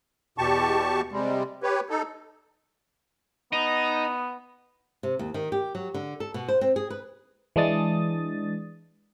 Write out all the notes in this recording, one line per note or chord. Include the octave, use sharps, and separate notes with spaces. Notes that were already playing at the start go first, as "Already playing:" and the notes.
E2 B2 G4 A5 C#6
C3 G3 G#3
G4 B4 C#5
D#4 A4
B3 D#4
C3
D#2
D#3
G4
F#3
D3
A4
B2
C5
C4
G#4
B4
E3 G#3 D4 D#6 A6